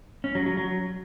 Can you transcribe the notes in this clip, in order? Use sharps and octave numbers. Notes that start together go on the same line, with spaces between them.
C#4
F#3
F#3
F#3